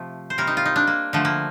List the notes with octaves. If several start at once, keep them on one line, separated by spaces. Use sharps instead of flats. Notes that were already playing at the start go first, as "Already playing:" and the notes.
Already playing: C3 F3 A3
C5
C3 G3 A#4
D#4
F4
D#4
D4
A#3
D3 F3 A3
A#3